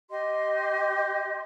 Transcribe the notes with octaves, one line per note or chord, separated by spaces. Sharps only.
G4 D#5 C6